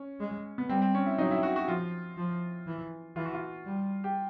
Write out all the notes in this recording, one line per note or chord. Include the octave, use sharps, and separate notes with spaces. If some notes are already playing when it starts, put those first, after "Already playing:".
Already playing: C#4
G#3
B3
G3 C4
C4
C#4
E4
F#3 D#4
E4
F#4
F#4
F3 F4
F3
E3
E3 F4
F#4
F4
G3
G4